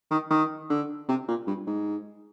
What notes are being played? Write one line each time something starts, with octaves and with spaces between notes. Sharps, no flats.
D#3
D#3
D3
C3
A#2
G2
G#2